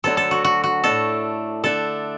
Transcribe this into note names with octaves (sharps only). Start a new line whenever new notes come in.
D2 D3 F#3 D4 A4
A4
F#4
F#4
F#4
A2 A3 D4 A4
D3 A3 D4 A4